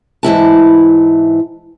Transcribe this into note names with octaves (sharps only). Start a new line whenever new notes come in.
G#2 E3 E4 A5